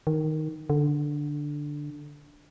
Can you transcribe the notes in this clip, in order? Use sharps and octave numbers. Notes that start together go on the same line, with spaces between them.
D#3
D3